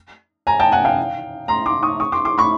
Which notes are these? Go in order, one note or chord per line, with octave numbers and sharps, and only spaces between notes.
G#5 A#5
G5 A5
F#5 G#5
F5 G5
A#5 C6
C6 D6
C#6 D#6
C#6 D#6
C6 D6
C6 D6
B5 C#6